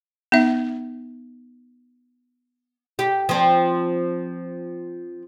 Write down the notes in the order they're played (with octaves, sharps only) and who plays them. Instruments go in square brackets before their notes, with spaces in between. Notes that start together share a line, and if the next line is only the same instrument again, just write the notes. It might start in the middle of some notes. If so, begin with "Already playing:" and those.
[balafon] B3 D#4 E5
[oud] G4
F3 C4